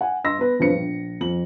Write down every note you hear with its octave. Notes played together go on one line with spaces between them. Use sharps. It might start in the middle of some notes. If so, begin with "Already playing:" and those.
F#5 G#5
G2 D#5 C6 E6 A#6
B3 B4
E1 G2 F3 C4 B4 C#7
A#1
F2 F#7